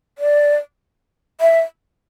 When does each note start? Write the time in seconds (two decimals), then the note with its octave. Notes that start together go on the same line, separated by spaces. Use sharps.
0.18 D5
1.41 E5